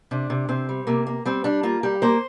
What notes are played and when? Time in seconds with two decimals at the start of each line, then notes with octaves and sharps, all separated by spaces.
0.11 C3 D4
0.30 C3
0.49 C3 C4
0.69 G3
0.87 C3 A#3
1.07 A#3
1.25 G3 C4
1.44 G3 D4
1.63 A#3 F4
1.83 G3 G4
2.02 A#3 C5